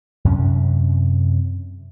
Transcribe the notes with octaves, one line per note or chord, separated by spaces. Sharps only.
F#2 C3 C#4